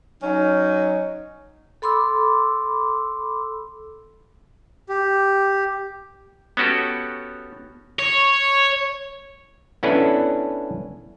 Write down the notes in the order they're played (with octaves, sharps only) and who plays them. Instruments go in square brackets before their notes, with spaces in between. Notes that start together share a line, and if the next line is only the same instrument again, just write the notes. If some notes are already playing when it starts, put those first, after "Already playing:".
[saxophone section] F#3 C#4 D#4
[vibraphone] A4 B5 C6 D6 E6
[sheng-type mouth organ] G4
[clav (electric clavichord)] B3 C#4 F#4 G4 A4
[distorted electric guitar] C#5
[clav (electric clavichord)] B3 C#4 D4 E4 A4 B4